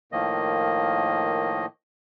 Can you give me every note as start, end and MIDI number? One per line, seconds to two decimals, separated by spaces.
0.12 1.66 45
0.12 1.66 51
0.12 1.66 53
0.12 1.66 58
0.12 1.66 75